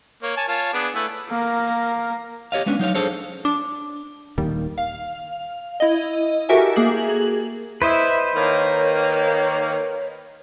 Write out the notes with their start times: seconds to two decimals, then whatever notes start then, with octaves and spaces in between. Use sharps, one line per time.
0.23 A#3 C#5
0.37 C#5 G#5 A5
0.48 F4 C#5 A5
0.73 B3 D4 G#4
0.95 A3 E4 B4
1.29 A#3 A#4
2.52 G4 C#5 D#5 F5
2.66 G#3 B3 C#4 D4
2.79 F#3 D#4 C#5 F5
2.95 D4 G#4 A4 C5 C#5
3.45 D4 D6
4.38 D#1 D#3 G3 A#3
4.78 F5
5.80 E4 D#5
6.49 F#4 G4 A4 A#4 E5 G#5
6.76 A#3 G#4 F#7
7.82 E4 B4 C5 D#5
8.35 D#3 A#3 C#5